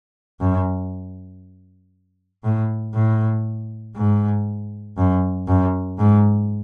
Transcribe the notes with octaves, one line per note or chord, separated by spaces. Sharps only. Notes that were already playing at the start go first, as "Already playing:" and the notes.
F#2
A2
A2
G#2
F#2
F#2
G#2